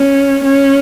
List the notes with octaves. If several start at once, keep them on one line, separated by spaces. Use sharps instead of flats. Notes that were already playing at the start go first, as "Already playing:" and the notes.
Already playing: C#4
C#4